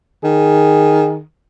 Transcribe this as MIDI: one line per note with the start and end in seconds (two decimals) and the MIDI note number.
0.24 1.22 51
0.24 1.16 68